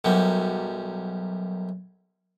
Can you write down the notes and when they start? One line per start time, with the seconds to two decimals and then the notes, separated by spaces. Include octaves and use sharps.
0.05 B1 F#2 G3